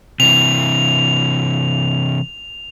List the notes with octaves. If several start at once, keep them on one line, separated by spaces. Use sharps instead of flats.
C3 E3 F7